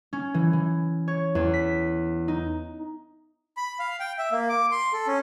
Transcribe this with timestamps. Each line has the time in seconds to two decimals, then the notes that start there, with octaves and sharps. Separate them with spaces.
0.13 C#4
0.34 E3
0.53 E3
1.08 C#5
1.35 E2
1.54 B6
2.28 D#4
3.57 B5
3.79 F5
4.00 G5
4.18 E5
4.32 A#3
4.49 D6
4.71 C6
4.93 A4
5.07 C#4